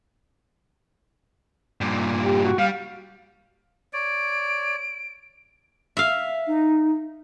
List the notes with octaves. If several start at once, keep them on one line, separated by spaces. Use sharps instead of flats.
G2 A#2
G4
F#4
G3 F5
C#5 D5 D7
E5 F5
D#4